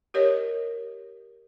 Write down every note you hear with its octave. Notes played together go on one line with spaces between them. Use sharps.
G4 A#4 C#5 D#5